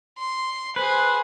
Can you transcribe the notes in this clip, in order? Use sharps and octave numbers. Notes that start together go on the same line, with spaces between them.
C6
G#4 B4 C5